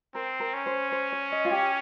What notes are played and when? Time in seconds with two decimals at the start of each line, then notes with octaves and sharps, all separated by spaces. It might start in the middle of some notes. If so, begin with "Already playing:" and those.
0.15 C4 A#4
0.40 A#4
0.54 C#4
0.66 C5
0.92 C5
1.12 C#5
1.32 D#5
1.45 F4
1.51 G4